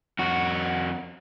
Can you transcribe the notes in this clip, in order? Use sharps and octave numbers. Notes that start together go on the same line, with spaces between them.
F2 F#4